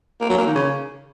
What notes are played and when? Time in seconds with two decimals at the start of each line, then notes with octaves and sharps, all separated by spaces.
0.21 A#3
0.29 F#3
0.38 A#3
0.47 D#3
0.55 C#3